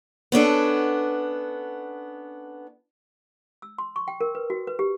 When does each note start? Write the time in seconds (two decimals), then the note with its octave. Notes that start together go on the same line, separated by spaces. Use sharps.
0.32 B3 C#4 D4 A4
3.62 E6
3.78 C6
3.96 C#6
4.08 G5
4.21 A#4
4.35 B4
4.50 F#4
4.67 B4
4.79 G4